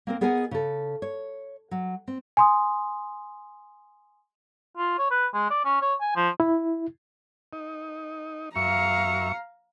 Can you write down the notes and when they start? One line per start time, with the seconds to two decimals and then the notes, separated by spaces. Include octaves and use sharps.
0.07 A#3 C4 A#4
0.21 B3 G#4 A#4 D#5 F#5 G#5
0.51 C#3 A4
1.02 C#5
1.71 F#3
2.08 C4
2.37 G#5 C6 D#6
4.77 F4
4.98 C#5
5.11 B4
5.34 G#3
5.50 D5
5.65 C#4
5.82 C#5
6.01 G#5
6.16 F3
6.40 E4
7.53 D#4
8.56 F#2 E5 F5 A#5 C#6 C#7